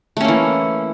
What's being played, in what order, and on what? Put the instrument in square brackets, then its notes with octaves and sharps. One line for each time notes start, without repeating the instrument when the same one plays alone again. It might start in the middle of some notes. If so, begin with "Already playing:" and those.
[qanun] A3
C#4
A#3
E3